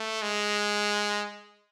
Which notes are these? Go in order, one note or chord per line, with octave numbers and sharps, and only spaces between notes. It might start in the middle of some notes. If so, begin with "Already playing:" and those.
Already playing: A3
G#3